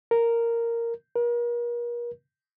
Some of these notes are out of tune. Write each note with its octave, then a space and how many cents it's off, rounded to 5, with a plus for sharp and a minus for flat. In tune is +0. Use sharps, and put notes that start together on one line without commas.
A#4 -5
A#4 +40